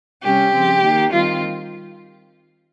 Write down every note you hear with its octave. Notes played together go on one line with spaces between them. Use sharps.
C3 G3 C#4 G4
C#3 F3 C4
D#3 A#3 D#4
D#3 G3 C4 F4